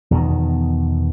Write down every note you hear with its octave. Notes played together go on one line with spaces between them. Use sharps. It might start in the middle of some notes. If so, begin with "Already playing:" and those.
E2 B2 D#3